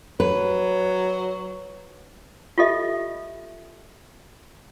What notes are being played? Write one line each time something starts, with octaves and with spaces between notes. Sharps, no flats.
F#3 B4
F4 G4 A4 D#5 E5